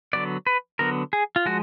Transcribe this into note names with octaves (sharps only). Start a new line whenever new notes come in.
D3 F#3 B3 D5
B4
D3 F#3 B3 A#4
G#4
F4
F3 G#3 F#4